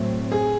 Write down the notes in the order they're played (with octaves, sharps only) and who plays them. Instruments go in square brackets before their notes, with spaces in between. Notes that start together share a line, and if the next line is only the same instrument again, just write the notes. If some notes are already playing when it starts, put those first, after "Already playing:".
Already playing: [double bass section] A2 F#3 A3 C4
[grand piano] G#4